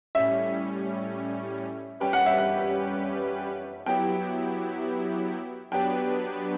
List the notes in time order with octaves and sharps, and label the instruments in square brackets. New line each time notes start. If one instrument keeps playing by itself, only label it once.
[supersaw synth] A2 G3 C#4 [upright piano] E5
[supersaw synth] G3 C#4 G4 B4 [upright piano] G5
[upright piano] F#5
E5
F#5
[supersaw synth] F#3 B3 E4 G4 [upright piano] G5
[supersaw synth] F#3 B3 D4 G4 B4 [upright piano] G5